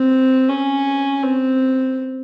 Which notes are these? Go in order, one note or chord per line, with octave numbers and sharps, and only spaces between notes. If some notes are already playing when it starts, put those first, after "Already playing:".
Already playing: C4
C#4
C4